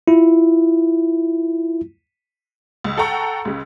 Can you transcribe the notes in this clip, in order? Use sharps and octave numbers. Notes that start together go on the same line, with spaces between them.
E4 F4
C#2
A4 F#5 G5 A#5 C#6
C#2 C#3